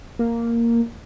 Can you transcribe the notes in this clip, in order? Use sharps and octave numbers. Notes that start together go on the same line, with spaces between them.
A#3